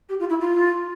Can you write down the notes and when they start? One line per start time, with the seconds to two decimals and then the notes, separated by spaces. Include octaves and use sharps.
0.09 G4
0.20 F4
0.30 E4
0.41 F4